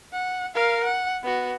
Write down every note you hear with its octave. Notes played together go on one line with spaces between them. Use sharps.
F#5
A#4 F5
F#5
B3 F#4